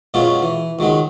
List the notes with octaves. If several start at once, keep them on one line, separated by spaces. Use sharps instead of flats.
F#2 B2 F#3 G#3 C#4 F4
E3
C#2 D#3 F#3 G#3